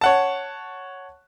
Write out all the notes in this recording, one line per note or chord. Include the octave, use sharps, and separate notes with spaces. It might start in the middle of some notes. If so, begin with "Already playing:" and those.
C#5 F#5 A5